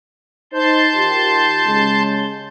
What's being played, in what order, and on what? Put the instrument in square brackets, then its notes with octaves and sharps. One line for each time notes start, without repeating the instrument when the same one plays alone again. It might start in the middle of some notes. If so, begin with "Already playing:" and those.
[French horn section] D#4 C5 [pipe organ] A5 C6 G6
[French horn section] D#3 F4 G4
C#3 G#3